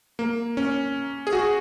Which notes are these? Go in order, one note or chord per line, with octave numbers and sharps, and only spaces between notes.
A#3
C#4
G#4
F#4